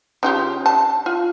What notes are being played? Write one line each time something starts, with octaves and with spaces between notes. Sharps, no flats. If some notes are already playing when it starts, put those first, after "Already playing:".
C#3 F4 G4
A5
F4